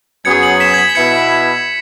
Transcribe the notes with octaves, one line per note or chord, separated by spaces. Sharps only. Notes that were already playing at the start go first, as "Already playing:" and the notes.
F#2 F#3 B3 G#4 G#6 C#7
C#7 F#7
B6 E7
G#6
B6
B6
B2 B3 E4 G#6 C#7